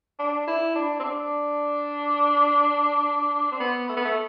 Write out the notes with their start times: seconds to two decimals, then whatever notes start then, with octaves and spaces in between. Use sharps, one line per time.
0.19 D4
0.47 E4
0.75 D4
0.99 C4
1.04 D4
3.52 C4
3.60 B3
3.89 A3
3.97 B3
4.05 A3